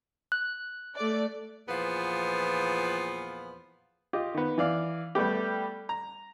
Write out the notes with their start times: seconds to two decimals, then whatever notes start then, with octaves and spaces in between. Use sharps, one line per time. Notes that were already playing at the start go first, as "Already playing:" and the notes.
0.32 F#6
0.96 A3 D5
1.68 E2 A#2 F3 B3
4.13 F4 G4 D#5
4.34 D#3 B3
4.58 E3 D5 F5
5.15 G3 A3 B3 G4
5.89 A#5